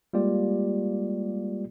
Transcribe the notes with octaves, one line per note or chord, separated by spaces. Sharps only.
G3 G#3 A#3 F4 G4 D5